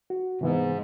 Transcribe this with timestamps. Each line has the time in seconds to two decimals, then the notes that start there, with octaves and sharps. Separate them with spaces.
0.10 F#4
0.41 G#2 C3 E3 B3